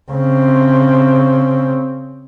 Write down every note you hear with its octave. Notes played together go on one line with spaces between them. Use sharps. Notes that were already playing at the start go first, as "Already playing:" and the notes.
C#3 C4